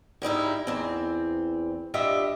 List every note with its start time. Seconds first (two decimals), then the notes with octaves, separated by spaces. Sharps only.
0.22 G#2 G3 D#4 E4
0.67 E2 C4
1.94 G2 F4 G4 D#5 E5